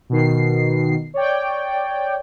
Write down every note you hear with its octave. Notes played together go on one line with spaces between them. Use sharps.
B2 D#3 C7
C#5 D5 G5